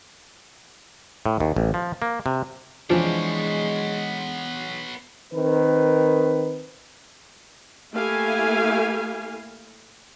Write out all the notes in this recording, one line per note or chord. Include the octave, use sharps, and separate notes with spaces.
A2
D#2
A1
F3
A#3
C3
E3 F3 G#3 B3 D4 C#5 D5
D#3 C4 A#4 B4
A3 A#3 E4 G4 F5 G#5